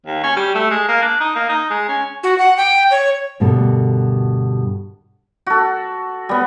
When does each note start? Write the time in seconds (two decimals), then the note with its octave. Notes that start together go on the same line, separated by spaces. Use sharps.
0.06 D#2
0.23 C#4
0.37 G3
0.55 A3
0.71 G#3
0.88 A#3
1.02 D4
1.21 D#4
1.35 A#3
1.49 D#4
1.70 G#3
1.88 C#4
2.23 F#4
2.38 F#5
2.57 G5
2.91 C#5
3.40 D2 G2 B2 A4 A#4
5.46 F#4 A4
6.29 G3 B3